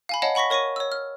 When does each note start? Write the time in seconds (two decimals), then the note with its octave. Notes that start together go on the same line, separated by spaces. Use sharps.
0.09 F5 G#5 B5
0.22 C#5 D#5 F5 F#5 A5
0.35 F#5 B5 C#6 A#6 B6
0.50 A#4 C#5 C#6 A#6 D#7
0.76 C#5 E6
0.92 F6